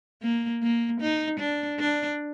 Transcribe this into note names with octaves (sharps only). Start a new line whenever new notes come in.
A#3
A#3
D#4
D4
D4